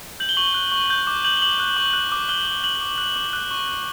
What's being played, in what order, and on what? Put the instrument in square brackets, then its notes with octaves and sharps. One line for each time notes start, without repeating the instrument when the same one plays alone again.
[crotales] G6 F#7
G7
C#6 F#7
G7
F#6
C#6
G6
D6
G6 F#7
G7
D6 F#7
F#6
C#6
F#6
D6
F#6 G7
D6
F#6 F#7
D6
F#6
D6
F#6
C#6
F#6